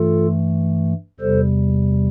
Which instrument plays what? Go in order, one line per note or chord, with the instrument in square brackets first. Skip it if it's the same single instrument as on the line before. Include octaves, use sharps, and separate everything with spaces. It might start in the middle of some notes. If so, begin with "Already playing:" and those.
Already playing: [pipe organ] G2 E3 A3 F4 A4
E2 C3 G3 A4 C5